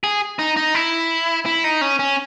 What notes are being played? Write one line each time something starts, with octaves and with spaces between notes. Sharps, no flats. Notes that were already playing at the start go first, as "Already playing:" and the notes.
G#4
D#4
D#4
E4
E4
D#4
C#4
C#4